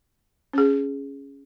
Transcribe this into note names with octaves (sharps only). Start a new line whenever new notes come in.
C#4 G#4